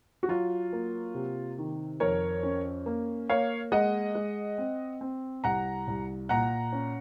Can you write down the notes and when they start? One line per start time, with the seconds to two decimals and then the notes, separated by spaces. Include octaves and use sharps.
0.23 F#4
0.29 F#3 F4
0.73 A#3
1.15 C3
1.58 D#3
2.00 F2 A#4 C#5
2.43 C#4
2.86 A#3
3.29 A#3 C#5 F5
3.72 G#3 D#5 F#5
4.15 G#3
4.58 C4
5.01 C4
5.44 C2 F#5 A#5
5.88 C2
6.29 A#2 F#5 A#5
6.72 C#4